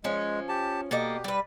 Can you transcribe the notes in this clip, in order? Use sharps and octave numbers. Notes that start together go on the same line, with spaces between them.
F3 G#3 C#4
G4 A5
B2 A#3 G4 A4 D#5
G3 B4